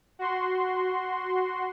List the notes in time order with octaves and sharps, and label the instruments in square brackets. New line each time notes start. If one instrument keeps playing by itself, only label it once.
[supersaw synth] F#4 C6